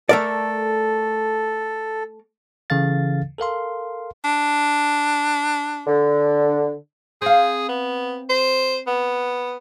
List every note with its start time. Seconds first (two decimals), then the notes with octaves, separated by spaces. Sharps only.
0.09 A3 A4 A#4 D5
2.70 C#3 E3 A4 F5 A6
3.38 A4 A#4 F5 C6
4.24 D4
5.87 D3
7.22 C4 G#4 F5
7.69 B3
8.30 C5
8.87 B3